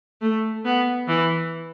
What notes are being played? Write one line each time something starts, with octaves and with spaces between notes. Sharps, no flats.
A3
B3
E3